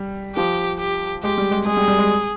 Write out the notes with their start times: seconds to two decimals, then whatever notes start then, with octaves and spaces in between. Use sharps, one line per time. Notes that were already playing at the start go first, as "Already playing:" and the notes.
Already playing: G3
0.36 F3 G4
0.79 G4
1.23 G#3 G4
1.38 G3
1.51 G#3
1.66 G#3 G#4
1.77 G3
1.88 G3
1.99 G#3